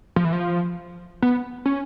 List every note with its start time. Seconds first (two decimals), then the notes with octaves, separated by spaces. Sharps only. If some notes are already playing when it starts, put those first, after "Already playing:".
0.16 F3
0.25 E3
0.33 F3
1.22 B3
1.66 C#4